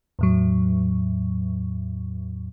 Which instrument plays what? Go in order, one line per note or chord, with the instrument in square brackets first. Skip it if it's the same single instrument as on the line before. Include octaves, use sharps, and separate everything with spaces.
[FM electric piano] E2 A2 F#3